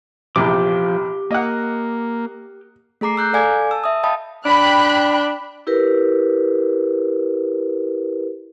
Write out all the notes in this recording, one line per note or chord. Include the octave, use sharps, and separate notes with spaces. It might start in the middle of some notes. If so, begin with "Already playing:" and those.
A#1 E2 C3 F3 G4 D6
A#3 D#5 F#5
A3 G#4 A#5 D6 C7
A#5 E6 F#6 G6
A4 D5 F5 G#5 D6 G#6
A5 E6
E5 D#6
D#5 F5 G5 A5 B5 D#6
D4 G5 B5 F#6
E4 G4 A#4 B4